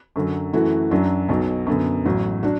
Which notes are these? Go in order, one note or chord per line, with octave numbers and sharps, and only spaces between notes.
F#2 D3 F#3
F#2 E3 A3 F#4
F#2 F#3 D4
B1 B2 F#3
F#2 D3 B3
A1 A2 F#3
F#3 D4 F#4